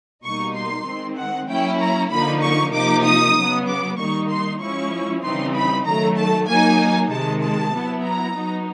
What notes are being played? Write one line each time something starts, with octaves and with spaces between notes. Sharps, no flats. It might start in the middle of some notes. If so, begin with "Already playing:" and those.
B2 G3 A#3 D#4 C#6
C6
D#3 G#3 C4
F#5
F#3 A#3 C#4 E4 G5
A#5
D3 F3 A#3 D#4 B5
C#6
C3 F3 A#3 D#4 D6
D#6
C#3 F#3 B3
D6
D#3 G3 A#3 D#4 C#6
C6
F3 G#3 C#4 E4 C#6
C#3 E3 G3 C4 D#4 C6
B5
D#3 F#3 A3 A#5
A5
F#3 A#3 D#4 G#5
C3 D#3 G#3 A5
A5
F#3 B3 E4
A#5
F#3 B3 D#4